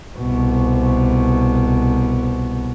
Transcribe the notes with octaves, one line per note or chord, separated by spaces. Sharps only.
C2 B2